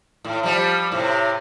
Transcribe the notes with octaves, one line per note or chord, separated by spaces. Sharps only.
A2
F3 G3
A2 C3